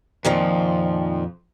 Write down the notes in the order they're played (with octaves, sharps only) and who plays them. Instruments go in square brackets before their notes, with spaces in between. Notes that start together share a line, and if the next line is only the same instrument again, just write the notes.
[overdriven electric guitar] F2 [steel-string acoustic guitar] A#2 D#3 F3